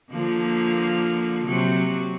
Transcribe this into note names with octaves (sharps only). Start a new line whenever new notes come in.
D3 F3 A#3
C3 F#3